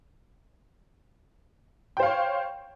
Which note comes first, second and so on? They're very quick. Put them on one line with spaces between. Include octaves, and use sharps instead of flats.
G5 C5 F5 C#5